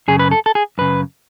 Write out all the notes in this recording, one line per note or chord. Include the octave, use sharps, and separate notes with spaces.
F#2 C#3 G#4
B4
A4
A4
G#4
F#2 C#3 B4